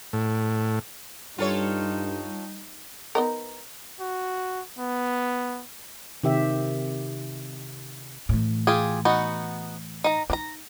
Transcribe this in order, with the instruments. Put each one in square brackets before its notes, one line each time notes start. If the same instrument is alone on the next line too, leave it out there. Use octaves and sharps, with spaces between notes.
[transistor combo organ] A2
[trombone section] G2 [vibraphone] G3 [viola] D#4 [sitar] F4 A4 C#5
[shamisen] B3 D#4 A#4
[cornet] F#4
B3
[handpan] C3 D#3 G4 E5
[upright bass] A2 E3
[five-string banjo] F4 G4 G#4
B3 D#4 F#4
D#4 A#5
[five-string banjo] D4 A#5 [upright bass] D#4